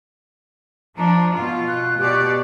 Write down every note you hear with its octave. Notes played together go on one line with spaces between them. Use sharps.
F3 D4 A#5
B2 F4
F#6
B2 G4 D5 F#6